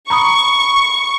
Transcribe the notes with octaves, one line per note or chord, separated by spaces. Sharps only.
A#5 B5 C#6 D#6